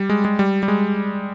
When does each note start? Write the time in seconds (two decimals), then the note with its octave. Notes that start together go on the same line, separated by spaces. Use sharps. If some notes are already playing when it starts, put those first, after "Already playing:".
Already playing: G3
0.10 G#3
0.25 G#3
0.39 G3
0.63 G3
0.68 G#3